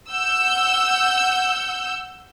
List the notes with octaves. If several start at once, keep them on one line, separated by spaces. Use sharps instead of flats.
F#5 E6 G6